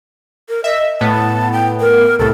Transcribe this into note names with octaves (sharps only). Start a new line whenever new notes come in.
A#4
D#5 E5
A2 B3 A5
G5
A#4
C2 A2 A4